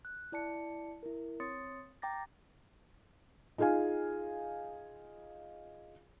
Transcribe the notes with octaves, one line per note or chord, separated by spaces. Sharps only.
F#6
E4 D5 A5 C#7
E4 A#4
C4 C#5 C6 D#6 A6 C#7
G5 A#5 D6 A6 A#6
D#4 F4 G#4 F5 G#5